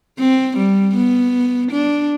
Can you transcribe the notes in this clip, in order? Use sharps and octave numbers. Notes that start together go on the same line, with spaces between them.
C4
G3
B3
D4